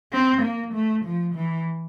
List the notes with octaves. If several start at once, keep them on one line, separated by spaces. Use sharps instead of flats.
C4
A#3
A3
F3
E3